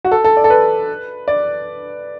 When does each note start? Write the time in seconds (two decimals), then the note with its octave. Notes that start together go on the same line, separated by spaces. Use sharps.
0.05 F#4
0.12 A4
0.24 A4
0.37 D5
0.44 A4
0.50 B4
1.28 D5